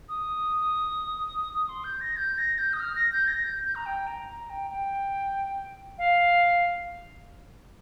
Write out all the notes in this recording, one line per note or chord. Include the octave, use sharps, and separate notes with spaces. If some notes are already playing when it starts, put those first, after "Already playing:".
D#6
D#6
C6
G6
A#6
G6
A#6
G6
D#6
F6
A#6
G6
A#6
G6
G6
A#5
G5
A#5
A#5
G5
G5
F5